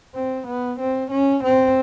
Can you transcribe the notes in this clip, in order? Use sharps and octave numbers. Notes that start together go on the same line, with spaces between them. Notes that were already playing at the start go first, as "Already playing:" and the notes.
C4
B3
C4
C#4
C4